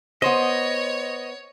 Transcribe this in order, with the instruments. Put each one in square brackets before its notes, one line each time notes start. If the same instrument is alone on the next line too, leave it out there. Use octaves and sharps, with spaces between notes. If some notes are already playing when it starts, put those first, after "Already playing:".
[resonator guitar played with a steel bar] B3 C5 [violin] C#5 [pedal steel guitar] D#5